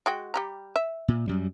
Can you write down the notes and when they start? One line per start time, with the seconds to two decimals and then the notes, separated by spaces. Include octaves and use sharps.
0.06 G#3 F#4 G5
0.34 G3 G4 A#5
0.76 E5
1.08 A#2
1.28 F#2 G3